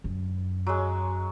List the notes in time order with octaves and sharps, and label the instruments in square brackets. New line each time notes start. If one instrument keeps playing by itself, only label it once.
[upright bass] F#2
[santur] F#3 G#3